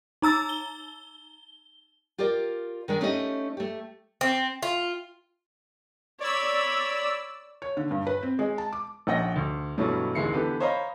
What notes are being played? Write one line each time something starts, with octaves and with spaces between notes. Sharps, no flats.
D#4 A#5 E6 A6
G7
F4 G4 A#4 D5
D#3 G#3 D4
A3 C#4 D#4 G4 D#5
A3 G4
C4
F4
C#5 D5 B5 E6
C#5
D3
G2
B4
C4
G#3
A5
D6
A#1 C#4 D#5 F#5 G5 A#6
D2
G2 B2 E3 F#3 G3 A3
F#1 D#2 G#3 E4 C7 C#7
D3 E3 B3 G4 A4 B4
C5 C#5 D#5 F5 A#5 B5